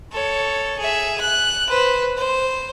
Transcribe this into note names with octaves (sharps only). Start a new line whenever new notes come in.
A4 C#5
G#4 E5
F#6
B4 C5
C5